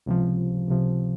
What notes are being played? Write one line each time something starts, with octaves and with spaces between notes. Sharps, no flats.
C#2 C3 F3
C#2 C3 F3